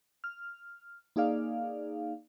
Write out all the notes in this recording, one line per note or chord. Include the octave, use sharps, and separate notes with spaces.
F6
A#3 D#4 G#4 D5 F5